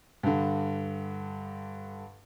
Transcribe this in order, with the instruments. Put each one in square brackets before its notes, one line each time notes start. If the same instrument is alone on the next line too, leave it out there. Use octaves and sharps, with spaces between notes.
[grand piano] G2 D3